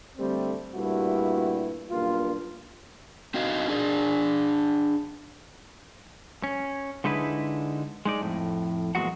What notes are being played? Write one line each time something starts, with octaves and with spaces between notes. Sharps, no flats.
D3 G3 A3 C4
G2 A#2 G3 A3 E4 F#4
B1 G2 A#3 F4
C4 D#4 F#4 D#5 F5
D4 G#4 D5
C#4
D3 G#3 D#4 E4 B4
G#3 D#4 D5
F2 A2
E2 A#2 F#3 G#3 F#4 F#5